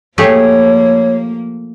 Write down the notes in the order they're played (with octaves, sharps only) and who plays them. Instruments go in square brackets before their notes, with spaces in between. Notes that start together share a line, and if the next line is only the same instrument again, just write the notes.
[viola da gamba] F3 A#3 [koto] A3 G4 G#4 [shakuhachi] C#5